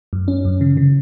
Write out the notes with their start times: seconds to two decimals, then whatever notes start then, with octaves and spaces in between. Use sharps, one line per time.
0.13 F#2
0.28 C#4
0.45 F#2
0.61 C#3
0.77 C#3